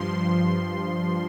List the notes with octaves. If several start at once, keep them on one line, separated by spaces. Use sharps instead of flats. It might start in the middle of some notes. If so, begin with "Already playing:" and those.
Already playing: G2 F3 C6